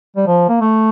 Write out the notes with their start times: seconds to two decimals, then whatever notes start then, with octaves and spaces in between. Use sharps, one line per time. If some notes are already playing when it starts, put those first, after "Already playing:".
0.16 G3
0.27 F3
0.49 A#3
0.61 A3